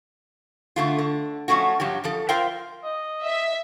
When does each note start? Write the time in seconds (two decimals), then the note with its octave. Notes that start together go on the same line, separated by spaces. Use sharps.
0.76 D3 A3 F4
0.99 D3
1.48 F3 G3 A3 C#4 F#4
1.80 G2 F3 F#3 G4
2.04 F#2 F3 A4
2.29 F4 A#4 C5 E5 F5 G5
2.84 D#5
3.24 E5